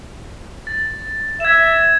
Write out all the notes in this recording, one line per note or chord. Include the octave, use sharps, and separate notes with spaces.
A6
E5 G#6 E7